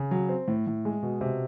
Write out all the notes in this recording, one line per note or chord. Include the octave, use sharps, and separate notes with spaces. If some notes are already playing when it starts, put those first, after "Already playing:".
Already playing: C#3
F#3
C4
A2
A2
G#3
B2
C3